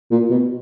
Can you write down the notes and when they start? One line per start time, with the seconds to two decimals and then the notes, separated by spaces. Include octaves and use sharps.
0.11 A#2
0.30 B2